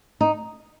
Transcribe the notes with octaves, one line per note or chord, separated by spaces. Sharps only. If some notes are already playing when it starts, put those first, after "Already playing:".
D#4